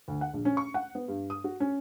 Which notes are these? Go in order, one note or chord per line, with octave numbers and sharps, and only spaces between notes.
D2
F#5
A#1
C#4
C#6
F#5
B3
G2
D#6
F#4
C#4